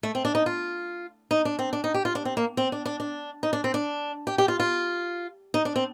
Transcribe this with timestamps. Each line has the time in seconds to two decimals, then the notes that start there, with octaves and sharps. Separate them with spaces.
0.03 A3
0.15 C4
0.25 D4
0.35 D#4
0.46 F4
1.31 D#4
1.45 D4
1.59 C4
1.73 D4
1.84 D#4
1.94 G4
2.05 F4
2.15 D4
2.25 C4
2.37 A#3
2.57 C4
2.72 D4
2.86 D4
3.00 D4
3.43 D#4
3.53 D4
3.64 C4
3.74 D4
4.27 G4
4.38 G4
4.48 F4
4.60 F4
5.54 D#4
5.65 D4
5.76 C4